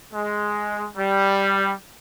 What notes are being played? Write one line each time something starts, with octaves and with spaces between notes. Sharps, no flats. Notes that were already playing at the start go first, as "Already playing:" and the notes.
G#3
G3